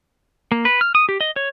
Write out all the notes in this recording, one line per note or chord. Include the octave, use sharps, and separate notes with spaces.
A#3
B4
F6
D#6
G4
D#5
C#5